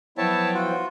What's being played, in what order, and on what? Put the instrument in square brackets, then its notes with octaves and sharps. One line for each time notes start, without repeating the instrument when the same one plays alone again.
[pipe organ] F3 F#3 [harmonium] B3 E4 G5 [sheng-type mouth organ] C#5 E5 A5
[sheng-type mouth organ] F4 F#4